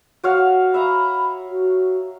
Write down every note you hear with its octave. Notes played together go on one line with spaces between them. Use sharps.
F#4 C#5 F5
E5 F5 A#5 B5
F#4